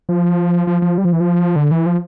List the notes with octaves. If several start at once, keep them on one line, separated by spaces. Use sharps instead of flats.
F3
F3
F3
G3
F3
E3
F3
D3
E3
F3